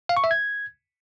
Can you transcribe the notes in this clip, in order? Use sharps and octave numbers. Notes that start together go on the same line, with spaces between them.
F5
C#6
E5
G#6